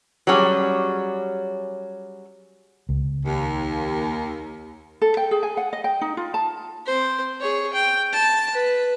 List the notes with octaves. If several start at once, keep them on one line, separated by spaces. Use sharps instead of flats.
F#3 G3 C#4 G#4
C#2
D#2
A4
G5
G#4
G#5
F#5
D#5
G5
D#4
F4
A5
C4 C5
G#4 C#5
G5
A5
B4